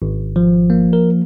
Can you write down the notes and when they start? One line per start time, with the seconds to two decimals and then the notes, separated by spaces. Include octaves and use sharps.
0.02 G#1
0.36 F3
0.70 A#3
0.93 A#4